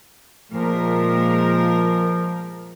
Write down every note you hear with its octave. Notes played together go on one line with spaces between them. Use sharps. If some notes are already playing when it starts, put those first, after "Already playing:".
A#2 F3 G#3 A#4